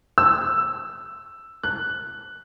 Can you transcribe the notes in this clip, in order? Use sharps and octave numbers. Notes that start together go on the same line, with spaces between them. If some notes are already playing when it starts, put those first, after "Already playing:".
E6
F#6